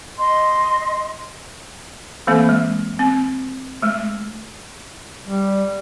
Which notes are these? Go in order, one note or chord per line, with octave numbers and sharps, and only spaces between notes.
D#5 C6
E3 A3 A#3 C4 A4
G#3
C4
G#3 A3
G3